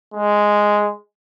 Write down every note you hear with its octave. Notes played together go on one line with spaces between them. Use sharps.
G#3